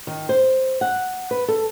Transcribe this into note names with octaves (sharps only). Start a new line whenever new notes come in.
D#3
C5
F#5
B4
A4